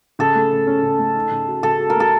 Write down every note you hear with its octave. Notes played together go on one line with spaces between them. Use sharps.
C#3 A4
A3
C#3
C#4
C#3
A3
D#4
C#3
F#4
C#3 A4
F#4
A#4
A3 A4